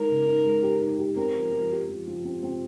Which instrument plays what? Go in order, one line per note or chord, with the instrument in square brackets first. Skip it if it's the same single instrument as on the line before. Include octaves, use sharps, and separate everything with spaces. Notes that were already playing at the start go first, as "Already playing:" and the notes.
Already playing: [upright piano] G#3 D#4 [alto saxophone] A#4
[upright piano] C#3
D#4
G#3
G4
D#4
G4
[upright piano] C4 [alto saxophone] A#4
[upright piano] F3
F3
G4
F3
F3
C4
C4